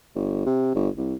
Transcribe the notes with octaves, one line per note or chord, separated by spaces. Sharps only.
G1
C3
G1
C2